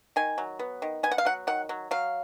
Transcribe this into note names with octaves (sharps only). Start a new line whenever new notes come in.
D#3 G#5
F#3
B3
D#3
B3 G#5
F#5
F5
F#3 F#5
D#3 F#5
F#3
F#3 F5